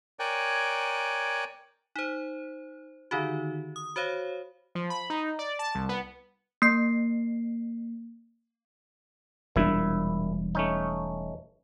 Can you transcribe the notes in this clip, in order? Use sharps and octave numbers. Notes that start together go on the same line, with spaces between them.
A#4 C#5 D5 G5 G#5 F#6
D#4 C5
D3 D#3 D#4 F#4
D#6
F#4 C5 C#5 F5
F3
B5
D#4
D5
A5
C2
B3
A#3 C7
E1 A#2 G3 D4 E4 E5
A3 C#4 D#4